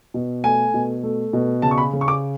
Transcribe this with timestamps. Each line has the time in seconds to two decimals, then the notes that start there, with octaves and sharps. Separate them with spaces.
0.14 B2
0.44 A3 G#5
0.74 B2
1.03 A3
1.33 B2
1.62 C#3 A5
1.71 C#6
1.78 B5
1.93 C#3
2.01 C#6
2.08 D6